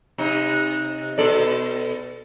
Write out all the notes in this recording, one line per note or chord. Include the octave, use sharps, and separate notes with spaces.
C3 D#4
B2 A4 D5